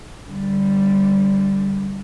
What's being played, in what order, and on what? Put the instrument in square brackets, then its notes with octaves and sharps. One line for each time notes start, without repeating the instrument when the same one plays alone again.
[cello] D3 G3